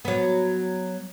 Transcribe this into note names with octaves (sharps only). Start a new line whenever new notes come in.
F#3 B3